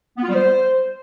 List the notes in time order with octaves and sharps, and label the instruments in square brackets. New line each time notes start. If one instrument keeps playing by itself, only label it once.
[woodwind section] B3
F4
G3
C5